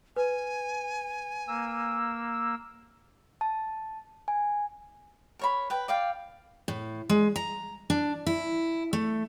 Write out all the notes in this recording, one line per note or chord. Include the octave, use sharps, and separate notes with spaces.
B4 G#5
A#3 E6
A5
G#5
A#4 C#5 B5
B4 G5
D5 F5 G5
A2
G#3
A#5
D4
E4
A3